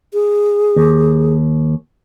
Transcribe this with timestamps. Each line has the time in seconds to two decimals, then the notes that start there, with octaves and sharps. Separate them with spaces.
0.14 G#4
0.76 D#2